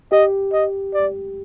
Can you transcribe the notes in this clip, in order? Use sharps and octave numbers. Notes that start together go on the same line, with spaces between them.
G4 D#5
D#5
D5